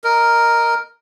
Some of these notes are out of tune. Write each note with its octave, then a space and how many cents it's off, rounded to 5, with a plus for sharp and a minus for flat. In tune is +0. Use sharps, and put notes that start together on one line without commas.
A#4 +0 D#5 -5